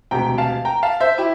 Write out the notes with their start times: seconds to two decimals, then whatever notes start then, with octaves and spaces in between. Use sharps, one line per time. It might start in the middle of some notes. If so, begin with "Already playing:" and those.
0.11 E1 D2 C3 G5 A#5
0.38 F5 A5
0.65 G5 A#5
0.83 F5 A5
1.00 C5 E5
1.18 E4 G4